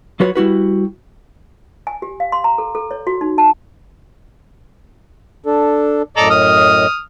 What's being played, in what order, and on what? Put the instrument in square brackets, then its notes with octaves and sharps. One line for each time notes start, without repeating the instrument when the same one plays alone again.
[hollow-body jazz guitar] F#3 F4 F#4 B4 C#5
G3 E4 F#4 B4
[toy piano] G#5
G4
F5
C6
A#5
A4
A4
C#5
F#4
D#4
A5
[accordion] D4 A4
[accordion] F#2 A2 D#5 [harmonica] A4 D5 A#5
[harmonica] D#6 F6